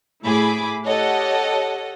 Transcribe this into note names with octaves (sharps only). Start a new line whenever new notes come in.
A2 E4 G#4 B5 D6
G4 A4 C#5 D#5 F#5 A5